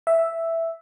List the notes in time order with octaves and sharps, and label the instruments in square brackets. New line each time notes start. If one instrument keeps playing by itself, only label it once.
[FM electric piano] E5